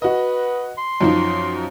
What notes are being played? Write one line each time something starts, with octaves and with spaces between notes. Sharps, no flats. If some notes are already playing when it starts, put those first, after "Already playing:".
F#4 B4 D#5
C6
F#2 F3 D#4